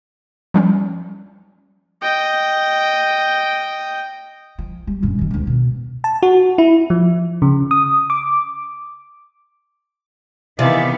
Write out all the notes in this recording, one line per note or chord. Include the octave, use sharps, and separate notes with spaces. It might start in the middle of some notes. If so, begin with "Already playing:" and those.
F3 G3 C#4
D#5 G5
F3
G3
A#1 F#2
D#3 F#3
D2 D3
B2
A5
F#4
E4
F3
C#3
D#6
D6
C3 D#3 E3 B3 D5 E5 F5